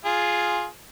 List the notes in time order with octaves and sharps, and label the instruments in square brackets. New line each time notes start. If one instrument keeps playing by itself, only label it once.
[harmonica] F4 G#4